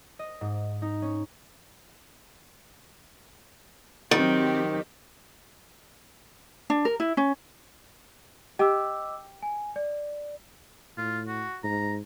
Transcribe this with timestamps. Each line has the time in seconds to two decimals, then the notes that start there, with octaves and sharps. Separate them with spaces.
0.19 D#5
0.41 G#2
0.82 D#4
1.02 C#4
4.11 D#3 F#3 C4 G4
6.70 D4
6.85 A#4
7.00 E4
7.17 C#4
8.59 G4 D#5 D6 E6
9.43 G#5
9.76 D5
10.98 A2 F4
11.27 F#4
11.64 G#2 A#5